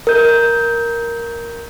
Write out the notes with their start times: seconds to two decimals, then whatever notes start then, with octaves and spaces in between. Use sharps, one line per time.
0.07 A#4 G6